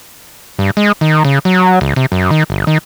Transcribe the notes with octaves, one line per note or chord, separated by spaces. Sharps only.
G2
G#3
D#3
C#3
F#3
C#2
C3
F#2
D#3
G1
D#3